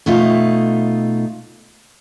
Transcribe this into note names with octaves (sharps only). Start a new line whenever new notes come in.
B2 A3 D#4 F4